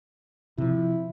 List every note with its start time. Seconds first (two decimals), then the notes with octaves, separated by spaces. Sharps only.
0.58 C3 F3 E4